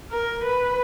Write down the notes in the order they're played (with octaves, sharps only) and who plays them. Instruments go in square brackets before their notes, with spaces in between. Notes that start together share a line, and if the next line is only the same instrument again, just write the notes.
[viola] A#4
B4